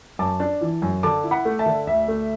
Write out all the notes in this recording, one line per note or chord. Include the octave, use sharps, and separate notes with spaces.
F#2 A5 D6
D4
E3
F#2
D3 A5 D6
E4
F#5 B5
A3
E5 A5
D3
D2 E5
A3